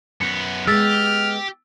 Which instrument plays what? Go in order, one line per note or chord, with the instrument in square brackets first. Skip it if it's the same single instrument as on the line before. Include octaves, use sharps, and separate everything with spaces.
[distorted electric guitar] F#2 B3 [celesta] C#7
[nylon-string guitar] G#3 B3 [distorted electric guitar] G4 [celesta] E6 A6 B6 [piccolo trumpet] F6